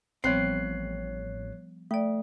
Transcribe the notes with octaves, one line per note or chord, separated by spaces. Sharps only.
A1 F3 G3 B3 C4 C#5 F#6 C7
A3 D5 G5